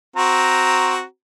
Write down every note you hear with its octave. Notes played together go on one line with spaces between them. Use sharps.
C4 F#4 A#5